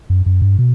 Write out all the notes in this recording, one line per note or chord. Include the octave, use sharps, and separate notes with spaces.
F#2
F#2
G2
B2